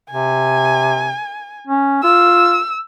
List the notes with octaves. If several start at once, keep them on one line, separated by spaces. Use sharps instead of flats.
C3 G#5
C#4
F4 E6